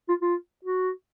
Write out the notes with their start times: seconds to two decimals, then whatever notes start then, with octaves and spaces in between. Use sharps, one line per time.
0.08 F4
0.21 F4
0.65 F#4